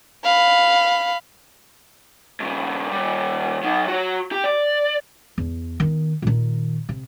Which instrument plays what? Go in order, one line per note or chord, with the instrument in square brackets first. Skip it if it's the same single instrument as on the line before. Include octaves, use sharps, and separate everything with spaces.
[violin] F5 B5
[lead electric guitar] G2 C#3
D#3 G3
F#3 D#4
F#4 C#5
G4
D5
[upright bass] E2
D#3 B3
A#2 D#3
C3